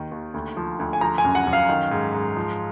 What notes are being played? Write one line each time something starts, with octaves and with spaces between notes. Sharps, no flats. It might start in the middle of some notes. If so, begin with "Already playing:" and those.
Already playing: D#2 D#3
D#2
D2
F3
D2
G#5
F3 A#5
G#5
F#2
F#5
F#2
F5
D#3
G#2
G#2
F3